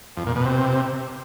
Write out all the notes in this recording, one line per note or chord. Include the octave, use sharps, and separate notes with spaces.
F2
A#2
B2
C3